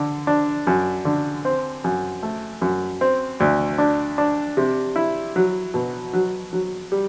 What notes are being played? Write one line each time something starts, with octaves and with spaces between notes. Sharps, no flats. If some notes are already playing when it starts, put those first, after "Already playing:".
Already playing: D3
D4
F#2
D3
C4
F#2
A3
F#2
C4
D2
D4
D4
C3
E4
F#3
B2
F#3
F#3
G3